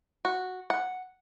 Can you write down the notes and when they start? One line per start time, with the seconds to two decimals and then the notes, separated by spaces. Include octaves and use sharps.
0.25 F#4
0.70 F#5